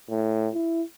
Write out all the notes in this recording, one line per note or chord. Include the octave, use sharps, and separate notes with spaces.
A2
E4